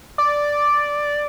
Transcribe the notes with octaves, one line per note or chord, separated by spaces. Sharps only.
D5